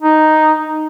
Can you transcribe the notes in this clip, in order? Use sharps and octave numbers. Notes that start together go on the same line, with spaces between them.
D#4